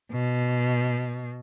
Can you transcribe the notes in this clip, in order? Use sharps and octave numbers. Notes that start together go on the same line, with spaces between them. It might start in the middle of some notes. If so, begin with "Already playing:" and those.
B2